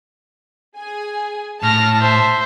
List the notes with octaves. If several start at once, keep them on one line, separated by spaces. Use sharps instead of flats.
G#4 G#5
A2 A5 F6 A#6
C5 E5